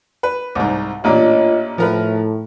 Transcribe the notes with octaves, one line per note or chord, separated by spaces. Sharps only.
B4
C2 G#2
A1 A#2 D4 F4 C#5 D#5
A2 F3 A#4 B4